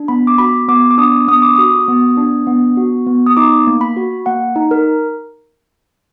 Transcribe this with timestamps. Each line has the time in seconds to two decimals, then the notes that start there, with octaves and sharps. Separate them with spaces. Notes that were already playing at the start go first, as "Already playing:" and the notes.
Already playing: D4
0.08 B3 B5
0.27 D6
0.38 F#4 B5
0.68 B3 D6
0.91 D6
0.98 D4 D#6
1.28 B3 D#6
1.42 D6
1.56 F#4 D#6
1.88 B3
2.17 D4
2.47 B3
2.77 F#4
3.07 B3
3.26 D#6
3.37 D#4 D6
3.67 A#3
3.81 B5
3.97 F#4
4.26 A#3 F#5
4.56 D#4
4.71 A#4